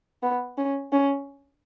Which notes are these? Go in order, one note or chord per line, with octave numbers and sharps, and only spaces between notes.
B3
C#4
C#4